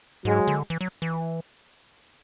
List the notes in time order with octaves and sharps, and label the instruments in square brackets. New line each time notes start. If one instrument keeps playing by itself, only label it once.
[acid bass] G#2 [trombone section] F#3 G#3
[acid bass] D3
E3
F#3
E3